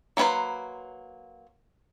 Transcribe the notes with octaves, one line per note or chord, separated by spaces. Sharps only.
F#3 A#3 D#4 B4 C5